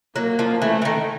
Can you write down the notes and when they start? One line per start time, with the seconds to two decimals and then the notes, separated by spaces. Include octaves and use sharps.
0.15 F#3 A#3
0.39 F3
0.62 E3 A3
0.82 E3
0.85 D#3